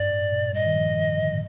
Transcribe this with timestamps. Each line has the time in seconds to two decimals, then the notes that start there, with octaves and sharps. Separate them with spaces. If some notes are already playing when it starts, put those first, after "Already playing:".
Already playing: G2 D5
0.10 A2
0.32 A#2
0.53 G3 D#5
0.66 D#3
0.76 F3
0.97 D#3
1.19 D3
1.29 A2